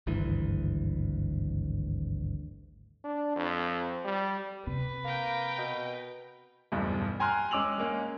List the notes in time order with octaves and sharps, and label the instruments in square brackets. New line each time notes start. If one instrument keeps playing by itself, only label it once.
[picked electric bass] G#1 D2 G2 E3
[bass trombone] D4
F2
G3
[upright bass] C3 [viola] B4
[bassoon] A#3 [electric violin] A#4 G5
[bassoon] B2
[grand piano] F#1 B1 E2 G2
G5 G#5 A#5 C6 F6 F#6
G#3 C#4 D6 E6 F7 F#7
G#3 A#3 C#4